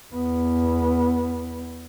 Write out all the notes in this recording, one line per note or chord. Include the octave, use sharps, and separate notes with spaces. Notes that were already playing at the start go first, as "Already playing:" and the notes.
E2 B3